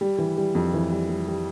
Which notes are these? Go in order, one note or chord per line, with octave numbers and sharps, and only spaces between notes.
G3
E3
G3
F2
E3
G3
G3
G3